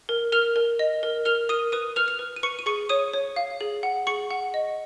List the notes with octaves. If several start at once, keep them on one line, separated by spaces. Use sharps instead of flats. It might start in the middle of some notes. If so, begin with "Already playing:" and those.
A#4
A#4 F6 F7
A#4
D#5
A#4
A#4 F6 F7
A#4 D#6 D#7
B4 D#6 D#7
B4 F6 F7
F6 F7
B4
D#7
B4 C#6 C#7
D#7
G#4 C#6 C#7
C#5 D#6 D#7
C#5
F5
G#4
F#5
G#4 C#6 C#7
F#5
D#5